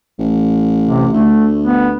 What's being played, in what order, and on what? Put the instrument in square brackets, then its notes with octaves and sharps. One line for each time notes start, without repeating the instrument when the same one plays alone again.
[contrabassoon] A1
[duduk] C3
[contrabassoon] D2 [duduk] A3
[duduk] B3